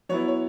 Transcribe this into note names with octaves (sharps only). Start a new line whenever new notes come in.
F#3 B3 E4 C#5
C#5